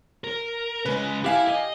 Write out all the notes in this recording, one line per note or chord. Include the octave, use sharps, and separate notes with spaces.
A#4
C#3 G#3 B4
E4 G4 F5 G#5
D#5